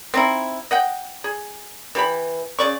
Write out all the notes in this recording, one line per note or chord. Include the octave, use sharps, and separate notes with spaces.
C4 D#4 E4
D#5 F#5 G5
G#4
E3 G4 B5
C#3 D5 C#6